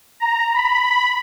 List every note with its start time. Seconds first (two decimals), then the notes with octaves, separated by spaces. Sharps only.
0.20 A#5
0.54 B5